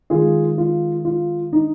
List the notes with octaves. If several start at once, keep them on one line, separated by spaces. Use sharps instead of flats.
D#3 G#3 F4 G#4
F4
F4
D#4